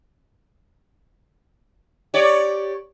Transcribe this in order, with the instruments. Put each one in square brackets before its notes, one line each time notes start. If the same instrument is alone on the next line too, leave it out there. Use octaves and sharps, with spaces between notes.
[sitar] G4 C#5 D5